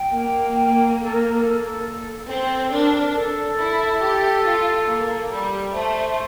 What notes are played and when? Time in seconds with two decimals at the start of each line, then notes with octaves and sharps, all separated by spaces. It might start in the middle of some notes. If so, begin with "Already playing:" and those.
Already playing: G5
0.12 A#3
0.55 G5
1.02 A4
1.14 A#4
1.42 A4
2.28 C4 A4
2.71 D4 A#4
3.15 A4
3.59 E4
4.02 G4
4.45 F4
4.88 A#3
5.31 G3
5.74 A3 C5